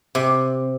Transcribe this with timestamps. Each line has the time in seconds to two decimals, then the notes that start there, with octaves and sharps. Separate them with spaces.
0.15 C3